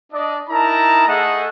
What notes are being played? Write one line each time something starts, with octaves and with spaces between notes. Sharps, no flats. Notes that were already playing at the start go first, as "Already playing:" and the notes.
D4 D5 D#5
D#4 E4 A#4 A5 A#5
A3 G#4 A4 D#5 E5 F#5